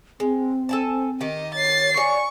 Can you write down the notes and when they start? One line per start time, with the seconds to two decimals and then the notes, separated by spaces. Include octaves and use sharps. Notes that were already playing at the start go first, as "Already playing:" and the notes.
0.20 G#3 C4
0.69 A4 G#5 A5
1.21 D#3 G4 D#5
1.55 C#5 A6 C7
1.97 D4 F#4 C#5 G#5 C#6